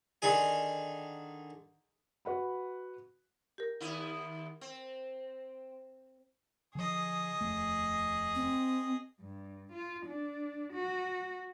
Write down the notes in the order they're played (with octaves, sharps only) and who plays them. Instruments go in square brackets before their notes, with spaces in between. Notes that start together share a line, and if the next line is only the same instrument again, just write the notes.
[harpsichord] D3 D#3 G#4 G#5
[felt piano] F#4 B4 F#5 B5
[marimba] G4 A#4
[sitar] D#2 B3 E4
C4
[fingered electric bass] D3 F3 [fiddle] G#4 D#5
[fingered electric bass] D#1 F2 A3
[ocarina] C4
[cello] G2
F4
D4
F#4